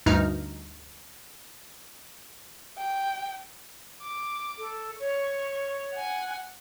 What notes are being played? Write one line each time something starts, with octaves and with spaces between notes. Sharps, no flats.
D2 G2 D#4 A#5 F6
G5
D6
A4
C#5 C#6
F#5 G#5